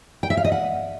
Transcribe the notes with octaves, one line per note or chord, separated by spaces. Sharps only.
G5
E5
F5
D#5
F#5